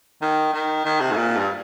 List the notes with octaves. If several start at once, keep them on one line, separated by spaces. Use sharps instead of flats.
D#3
D#3
D#3
C3
G#2
A#2
G2